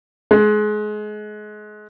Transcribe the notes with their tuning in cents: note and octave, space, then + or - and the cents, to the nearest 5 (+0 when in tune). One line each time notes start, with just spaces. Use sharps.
G#3 +25